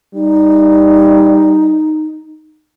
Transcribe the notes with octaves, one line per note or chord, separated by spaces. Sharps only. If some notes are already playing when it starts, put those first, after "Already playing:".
G3 D#4